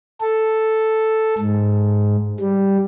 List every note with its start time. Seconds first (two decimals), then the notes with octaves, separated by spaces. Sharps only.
0.21 A4
1.38 G#2
2.40 G3